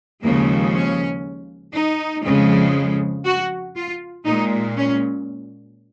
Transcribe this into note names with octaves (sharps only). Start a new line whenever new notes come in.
D#2 C#3 F3 G#3 A#3
C#4
D#4
F2 C#3 F3 G#3
F#4
F4
A#2 G#3 D#4
C#4